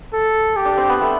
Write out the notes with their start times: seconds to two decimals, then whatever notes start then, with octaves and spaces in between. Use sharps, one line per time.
0.14 A4
0.56 G4
0.65 D4
0.77 C4
0.89 B3
1.01 A3